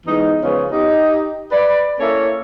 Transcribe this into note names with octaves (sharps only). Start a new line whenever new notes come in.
E2 E3 G#3 D#4
C#3 F3 B3 C#4
D#4 G4
B4 D5
A#3 C#4 E4 A4 C#5